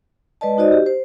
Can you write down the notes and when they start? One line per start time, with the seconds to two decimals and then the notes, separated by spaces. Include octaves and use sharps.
0.41 G#3 B4 D5 D#5 A5
0.58 D#4 F#4 C5 D5 D#5
0.72 G4
0.86 C5